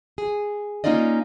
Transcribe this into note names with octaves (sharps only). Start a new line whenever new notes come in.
G#4
A#3 C#4 D#4 F4 D5 D#5